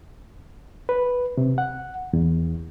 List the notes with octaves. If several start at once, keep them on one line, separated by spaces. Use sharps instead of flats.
B4
C3
F#5
E2